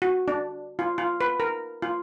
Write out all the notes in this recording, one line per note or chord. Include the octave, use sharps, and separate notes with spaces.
F#4
D4
F4
F4
B4
A#4
F4